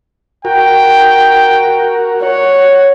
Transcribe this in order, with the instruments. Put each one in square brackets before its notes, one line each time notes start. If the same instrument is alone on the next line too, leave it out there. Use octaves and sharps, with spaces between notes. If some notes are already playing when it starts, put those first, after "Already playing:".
[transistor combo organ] F#4 A#4 [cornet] G5
[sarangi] C#5 [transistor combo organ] F#5